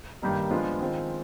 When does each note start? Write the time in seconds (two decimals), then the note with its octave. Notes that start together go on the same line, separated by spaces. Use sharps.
0.22 G2 D#3 G3 A#3 D#4
0.51 F3 G#3 B3 D4 F4
0.80 D#3 G#3 C4 F4